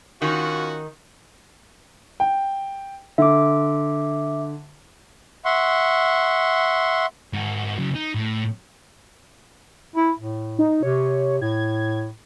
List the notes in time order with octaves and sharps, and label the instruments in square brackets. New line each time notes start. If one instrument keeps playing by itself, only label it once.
[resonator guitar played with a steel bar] D#3 [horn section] C#4 F4 F#4
[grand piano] G5
[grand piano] D3 [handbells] E5 D6
[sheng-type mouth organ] E5 F#5 C6 C#6
[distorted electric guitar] G#2 F#4
C#3 F#3
D#4
A2
[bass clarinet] E4
A2
[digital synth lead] D#4
[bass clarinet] C3 [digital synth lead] C#5
[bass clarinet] A2 [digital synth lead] G#6